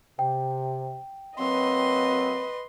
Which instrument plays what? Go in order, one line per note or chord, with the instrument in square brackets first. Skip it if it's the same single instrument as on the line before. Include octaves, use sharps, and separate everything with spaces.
[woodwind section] C3 [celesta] G5
[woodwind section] F#3 A#3 C4 [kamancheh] B4 D#5 [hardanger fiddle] C6